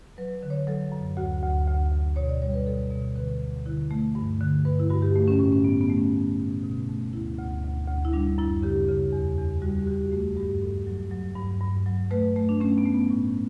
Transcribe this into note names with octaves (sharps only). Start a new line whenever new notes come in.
F#3 B4
D3
C#5
F#3 A4
F#2
D2 F#4
D2
D2
D2
B2 C#5
D5
G3 C#5
B4
B2 A4
B2
D3 B4
D2
D3 E4
A3
G2
D3
G2 B4
E4
G2 F#4
G4
A3
C#4
A2 C#4
C#4
A2 B3
B3
A3
C#4
A3
B2
B2
A3
D2 E4
D2
D2
D2
E4
G3 D4
F#2 E4
C#3 G4
C#3
E2
E2
G3 F#4
G4
E2 F#4
G4
A3 F#4
G2 G4
G2 A4
F#3
F#3
G2
G2
F#3
A3 B4
A3
D4
A3 C#4
B3
A3
B3
A2